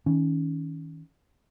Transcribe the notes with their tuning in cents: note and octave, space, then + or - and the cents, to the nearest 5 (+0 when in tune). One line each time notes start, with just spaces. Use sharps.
D#3 +35 C#4 +10